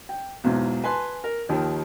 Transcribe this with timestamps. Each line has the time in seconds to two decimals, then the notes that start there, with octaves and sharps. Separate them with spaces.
0.09 G5
0.44 B1 E2 G#2
0.84 B4 G#5 A5 C6
1.24 A#4
1.49 D#2 D#3 F3